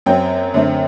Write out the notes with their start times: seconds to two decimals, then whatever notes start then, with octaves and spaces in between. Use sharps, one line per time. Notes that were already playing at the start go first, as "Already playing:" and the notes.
0.06 F#2 F#3 C4 G5
0.54 F#2 D3 A3 C4